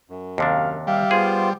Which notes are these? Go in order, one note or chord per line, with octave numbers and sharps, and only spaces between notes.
F#2
D#2 C3 D4 F5
G3 E5 F5
B3 F4 G#4 C5